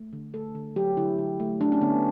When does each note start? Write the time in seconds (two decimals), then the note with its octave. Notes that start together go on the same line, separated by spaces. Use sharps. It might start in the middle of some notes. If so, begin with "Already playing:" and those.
Already playing: A3
0.13 D3
0.34 A3 A4
0.55 D3
0.76 F#3 G4
0.97 D3 E4
1.18 D3
1.40 A3
1.61 A3 D4
1.72 C#4
1.81 D3 B3